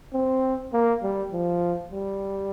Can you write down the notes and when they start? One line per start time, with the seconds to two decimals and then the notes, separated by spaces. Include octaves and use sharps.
0.13 C4
0.73 A#3
1.03 G3
1.33 F3
1.92 G3